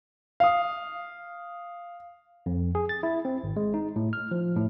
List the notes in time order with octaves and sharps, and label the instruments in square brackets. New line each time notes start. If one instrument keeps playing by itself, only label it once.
[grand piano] F5 D#6
[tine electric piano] F2
G#4
A6
E4
C4
G#1
G#3
D#4
A2
F6
F3
A2